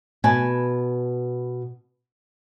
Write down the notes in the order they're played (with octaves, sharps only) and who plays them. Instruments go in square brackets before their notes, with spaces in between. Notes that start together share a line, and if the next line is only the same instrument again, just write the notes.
[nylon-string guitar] B2 B4 G#5 A5